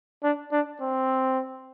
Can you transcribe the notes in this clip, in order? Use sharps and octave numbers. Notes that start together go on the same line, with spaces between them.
D4
D4
C4